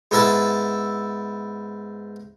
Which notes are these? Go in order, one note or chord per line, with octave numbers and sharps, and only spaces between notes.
G#2 B3 E4 E5 A5